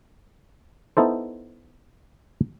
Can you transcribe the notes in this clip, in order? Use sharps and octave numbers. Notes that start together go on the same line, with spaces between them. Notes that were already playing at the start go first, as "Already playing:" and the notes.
B3 D#4 E4 A4 C5